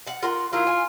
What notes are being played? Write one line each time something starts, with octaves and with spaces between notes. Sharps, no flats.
F5 F#5
F4 A#4 F#5
F#3 E4 F4 A#4
G#5